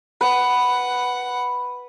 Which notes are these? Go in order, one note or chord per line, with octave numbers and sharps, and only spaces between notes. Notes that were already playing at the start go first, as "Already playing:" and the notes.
B4 F#5